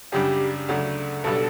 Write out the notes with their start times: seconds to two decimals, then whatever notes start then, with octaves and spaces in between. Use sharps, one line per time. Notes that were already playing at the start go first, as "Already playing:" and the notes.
0.12 F#2 C#3 G3 D4 G4
0.68 D2 C#3 F#3 A3 D4
1.24 B1 B2 G3 B3 D4 A4